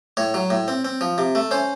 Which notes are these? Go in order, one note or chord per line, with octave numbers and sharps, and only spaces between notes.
A2 C#5
F#3
A2
C4
C4
F3
C3
A3
C#4 C5